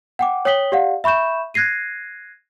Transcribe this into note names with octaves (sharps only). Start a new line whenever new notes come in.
F#5 G5 D6
C#5 G5 D#6 B6 F#7 G7
G4 D5 F5 F#5
E5 B5 C#6 G6 E7
F#6 G#6 A#6 C7 D#7